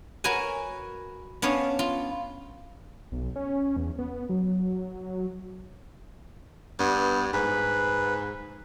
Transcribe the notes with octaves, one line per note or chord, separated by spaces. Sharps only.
F#4 A#4 B4 C#5 G#5
B3 C#4 D4 C#5 F5
F4
B1
C#4
E2
B3
F#3
G2 B3
G#2 B4